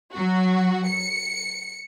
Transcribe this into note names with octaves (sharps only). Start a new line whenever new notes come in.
F#3 F#4
C#7